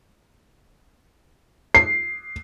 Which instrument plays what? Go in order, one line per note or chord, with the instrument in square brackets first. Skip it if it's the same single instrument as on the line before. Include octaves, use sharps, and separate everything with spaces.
[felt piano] C7